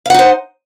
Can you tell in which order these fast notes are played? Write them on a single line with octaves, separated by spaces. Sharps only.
F5 F#5 D#4 C5